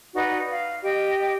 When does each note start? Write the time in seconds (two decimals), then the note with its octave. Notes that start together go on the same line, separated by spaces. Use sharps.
0.15 D#4 F#4 B4 D5
0.50 F5
0.83 G4 D#5 G5